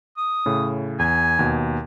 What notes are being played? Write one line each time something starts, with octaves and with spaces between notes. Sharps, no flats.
D#6
A2 C#3
E2 G#5
D#2 B2